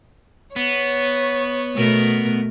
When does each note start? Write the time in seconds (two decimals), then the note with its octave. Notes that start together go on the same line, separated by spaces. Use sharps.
0.56 B3 C#5
1.75 B2 A3 A#4